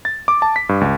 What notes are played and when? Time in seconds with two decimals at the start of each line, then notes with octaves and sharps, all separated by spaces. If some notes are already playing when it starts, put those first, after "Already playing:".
0.05 A6
0.28 D6
0.42 A5
0.56 B6
0.69 G2
0.81 C#2